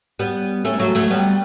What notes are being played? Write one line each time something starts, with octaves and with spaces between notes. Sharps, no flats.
G3 B3
A3 C#4
F#3 A3
F#3 A3
G3 B3